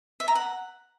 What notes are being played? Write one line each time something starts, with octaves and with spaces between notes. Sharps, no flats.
E5
A#5
F#5